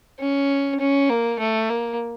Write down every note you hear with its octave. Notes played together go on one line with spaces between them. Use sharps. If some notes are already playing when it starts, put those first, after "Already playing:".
C#4
C#4
A#3
A3
A#3